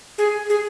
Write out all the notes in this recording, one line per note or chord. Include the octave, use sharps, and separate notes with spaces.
G#4
G#4